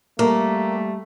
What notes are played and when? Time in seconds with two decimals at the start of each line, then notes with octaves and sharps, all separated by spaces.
0.19 G3 A3 A#3